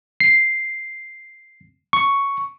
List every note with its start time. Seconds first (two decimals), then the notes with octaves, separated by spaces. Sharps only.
0.20 C7
1.93 C#6